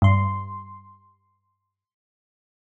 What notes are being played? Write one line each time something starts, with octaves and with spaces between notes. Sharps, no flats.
G2 C6